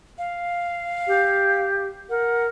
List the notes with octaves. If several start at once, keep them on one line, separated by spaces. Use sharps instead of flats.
F5
G4
A#4 F#5